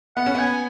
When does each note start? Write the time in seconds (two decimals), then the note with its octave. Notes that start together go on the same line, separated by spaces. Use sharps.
0.17 B3 F#5
0.26 C#4
0.35 B3 G#5